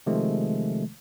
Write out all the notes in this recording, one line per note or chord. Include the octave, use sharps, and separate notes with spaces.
C3 D#3 F3 G#3 A3